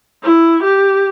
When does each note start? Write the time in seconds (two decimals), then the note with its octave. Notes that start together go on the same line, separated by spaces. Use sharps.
0.24 E4
0.63 G4